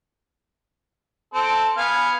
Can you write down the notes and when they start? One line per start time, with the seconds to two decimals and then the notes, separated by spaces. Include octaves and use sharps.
1.34 C4 A4
1.77 B3 F5 G#5